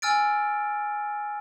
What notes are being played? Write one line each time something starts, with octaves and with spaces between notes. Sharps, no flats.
G#5 E6 F6 A6 D7